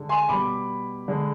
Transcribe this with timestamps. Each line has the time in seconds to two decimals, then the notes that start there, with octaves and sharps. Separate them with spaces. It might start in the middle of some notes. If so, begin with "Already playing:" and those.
Already playing: D3 G#3
0.09 G#5 C6
0.29 B2 G3 B5 D6
1.08 D3 G#3